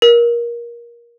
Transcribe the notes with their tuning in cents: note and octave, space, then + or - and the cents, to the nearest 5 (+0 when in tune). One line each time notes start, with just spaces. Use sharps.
A#4 +20